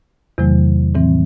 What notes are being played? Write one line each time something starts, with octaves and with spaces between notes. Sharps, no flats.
E2 C3 D#3 F#3 A3
A2 E3 G3 C4